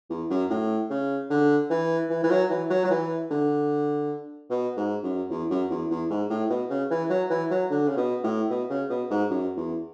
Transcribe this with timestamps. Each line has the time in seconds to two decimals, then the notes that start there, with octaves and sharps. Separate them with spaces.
0.10 E2
0.30 F#2
0.50 A2
0.90 C#3
1.30 D3
1.70 E3
2.10 E3
2.24 E3
2.30 F#3
2.50 E3
2.70 F#3
2.84 F#3
2.90 E3
3.31 D3
4.50 B2
4.77 G#2
5.03 F#2
5.30 E2
5.50 F#2
5.70 E2
5.90 E2
6.10 G#2
6.30 A2
6.50 B2
6.70 C#3
6.90 E3
7.10 F#3
7.30 E3
7.50 F#3
7.70 D3
7.88 C#3
7.97 B2
8.24 A2
8.50 B2
8.70 C#3
8.90 B2
9.10 G#2
9.30 F#2
9.57 E2